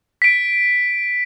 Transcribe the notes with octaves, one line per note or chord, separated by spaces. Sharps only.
B6 D7